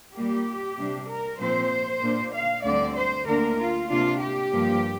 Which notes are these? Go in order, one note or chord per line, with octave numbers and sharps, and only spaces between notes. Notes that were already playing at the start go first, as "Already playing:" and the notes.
A#2 G3 A#3 G4
C3 G3 D4
A#4
A#2 F3 C4 C5
A#2 A#3 D4
F5
D2 D3 G3 C4 D5
C5
D2 D3 A#3 D4 A#4
F4
C3 A#3 D4 F4
G4
G2 F3 A#3